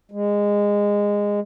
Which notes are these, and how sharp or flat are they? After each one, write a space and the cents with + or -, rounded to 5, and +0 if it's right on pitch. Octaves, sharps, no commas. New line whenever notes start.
G#3 -20